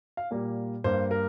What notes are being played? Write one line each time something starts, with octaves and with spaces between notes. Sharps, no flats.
F5
A#2 G3 A#3
G2 G3 A#3 C5
A#4